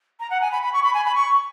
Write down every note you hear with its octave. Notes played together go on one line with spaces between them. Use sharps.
A#5
F#5
G#5
B5
B5
C#6
B5
G#5
B5
C#6